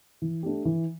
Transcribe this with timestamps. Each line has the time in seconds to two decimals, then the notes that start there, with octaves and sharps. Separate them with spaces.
0.22 E3
0.43 A3 D4 G4
0.65 E3